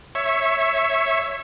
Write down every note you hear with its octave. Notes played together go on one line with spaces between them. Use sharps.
C#5 E5